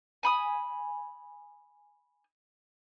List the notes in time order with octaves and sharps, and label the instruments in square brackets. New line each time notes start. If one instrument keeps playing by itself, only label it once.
[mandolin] G#5 B5 D#6